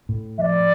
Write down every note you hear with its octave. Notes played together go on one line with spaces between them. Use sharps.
A2
F3 D5 E5